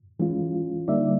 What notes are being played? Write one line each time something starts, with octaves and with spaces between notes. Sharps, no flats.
E3 G#3 C#4 F4
D3 G3 A#3 D#4 D5 E5